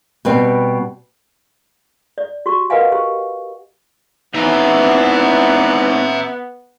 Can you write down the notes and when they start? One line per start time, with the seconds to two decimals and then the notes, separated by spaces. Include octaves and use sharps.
0.25 B2 G3 C4
2.18 D5
2.46 F#4 G4 C#6
2.70 A#4 B4 D#5 F5 F#5 G#5
2.92 G4
4.35 E3 B3 C4 D#4 E5 A#5